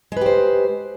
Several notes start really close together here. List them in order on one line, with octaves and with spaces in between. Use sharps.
G#3 B4 G4 C5